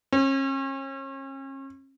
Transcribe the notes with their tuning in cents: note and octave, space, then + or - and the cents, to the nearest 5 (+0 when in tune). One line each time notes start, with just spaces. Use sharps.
C#4 -40